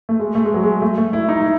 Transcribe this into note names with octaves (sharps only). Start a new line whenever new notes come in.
A3
G#3
A3
G#3
F#3
G#3
A3
A3
E4
D#4
E4